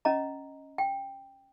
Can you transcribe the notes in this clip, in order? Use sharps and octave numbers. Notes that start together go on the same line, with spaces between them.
C#4 D#5 A#5
G5